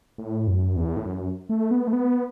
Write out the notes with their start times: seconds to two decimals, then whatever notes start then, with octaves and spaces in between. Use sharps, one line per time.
0.18 A2
0.47 F#2
0.76 E2
0.97 A2
1.06 F#2
1.49 A3
1.71 B3
1.87 A3
1.93 B3